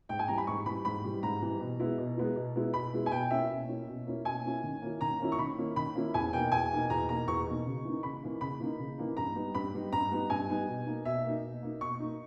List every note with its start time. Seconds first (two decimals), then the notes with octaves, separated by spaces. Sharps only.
0.09 G#2 G5
0.19 G#5
0.28 E3 G3 A#5
0.38 B5
0.47 G#2 C#6
0.66 E3 G3 B5
0.85 G#2 B5
1.04 E3 G3
1.22 G#2 A#5
1.42 E3 G3
1.60 B2
1.79 G#3 B3 E4
1.98 B2
2.17 G#3 B3 E4
2.36 B2
2.55 G#3 B3 E4
2.74 B2 B5
2.93 G#3 B3 E4
3.06 G#5
3.12 B2 G5
3.31 A#3 C#4 E4 E5
3.50 B2
3.68 A#3 C#4 E4
3.87 B2
4.06 A#3 C#4 E4
4.25 B2 G#5
4.44 A#3 C#4 E4
4.63 D#3
4.82 A#3 C#4 E4
5.01 D#3 A#5
5.19 A#3 C#4 E4
5.32 C#6
5.39 D#3 B5
5.58 A#3 C#4 E4
5.76 D#3 B5
5.95 A#3 C#4 E4
6.14 E2 G#5
6.33 B2 A#3 D#4 G5
6.52 E2 G#5
6.71 B2 A#3 D#4
6.90 E2 A#5
7.09 B2 A#3 D#4 A#5
7.28 E2 C#6
7.47 B2 A#3 D#4
7.66 C#3
7.84 E3 A#3 D#4
8.03 C#3 B5
8.22 E3 A#3 D#4
8.41 C#3 B5
8.60 E3 A#3 D#4
8.79 C#3
8.98 E3 A#3 D#4
9.17 G2 A#5
9.35 G3 B3 D#4
9.54 G2 B5
9.73 G3 B3 D#4
9.92 G2 A#5
10.11 G3 B3 D#4
10.30 G2 G#5
10.49 G3 B3 D#4
10.68 B2
10.86 A#3 D#4
11.05 B2 E5
11.24 A#3 D#4
11.43 B2
11.63 A#3 D#4
11.81 B2 C#6
12.00 A#3 D#4